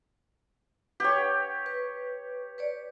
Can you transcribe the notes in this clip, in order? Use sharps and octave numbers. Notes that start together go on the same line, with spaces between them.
G4 B4 C#5 F#5 G5
B4
B4 C#5 D5